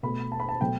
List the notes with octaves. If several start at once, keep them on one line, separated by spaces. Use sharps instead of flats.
B2 A3 B5
A5
B5
A5
B2 F#3 A3 G5